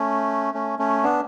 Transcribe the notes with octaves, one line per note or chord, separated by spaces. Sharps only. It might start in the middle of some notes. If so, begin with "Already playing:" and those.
Already playing: A3 C#4
A3 C#4
A3 C#4
B3 D4